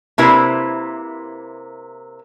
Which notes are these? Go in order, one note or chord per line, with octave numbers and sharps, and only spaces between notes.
C3 A#3 E4 B4 C5